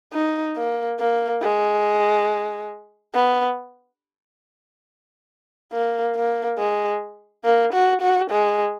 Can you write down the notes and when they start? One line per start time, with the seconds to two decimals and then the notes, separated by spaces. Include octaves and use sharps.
0.13 D#4
0.56 A#3
1.00 A#3
1.42 G#3
3.14 B3
5.72 A#3
6.16 A#3
6.58 G#3
7.45 A#3
7.73 F#4
8.01 F#4
8.31 G#3